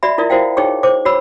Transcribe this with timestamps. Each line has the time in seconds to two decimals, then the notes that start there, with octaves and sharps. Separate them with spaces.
0.03 F#4 D5 E5 B5
0.18 E4 F4 A#4 D5 E5
0.30 E4 F#4 A#4 C5 F5 G5
0.57 D#4 G#4 C#5 G5 C#6
0.83 C5 D6
1.05 F#4 C#5 B5 E6